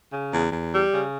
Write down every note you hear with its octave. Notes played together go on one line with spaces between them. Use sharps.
C#3
E2
E2
G3
C#3